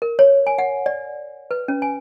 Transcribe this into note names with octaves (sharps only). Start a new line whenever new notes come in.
A#4
C#5
G#5
F#5
D5
B4
C#4
G#5